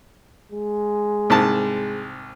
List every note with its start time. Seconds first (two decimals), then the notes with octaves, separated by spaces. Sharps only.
0.52 G#3
1.30 C2 G#2 A5